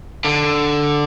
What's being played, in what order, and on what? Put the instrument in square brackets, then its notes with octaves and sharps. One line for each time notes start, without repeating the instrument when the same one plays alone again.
[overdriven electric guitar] D3